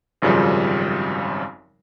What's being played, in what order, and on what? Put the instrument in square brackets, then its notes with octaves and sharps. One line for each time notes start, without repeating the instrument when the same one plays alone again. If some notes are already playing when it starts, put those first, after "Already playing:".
[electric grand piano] G#1 F#2 C#3 F3 G3